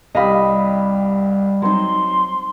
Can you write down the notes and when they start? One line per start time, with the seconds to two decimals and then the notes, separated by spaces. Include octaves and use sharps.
0.15 C2 G3 G4 D#5 F5 B5
1.62 F#3 C4 D#4 C6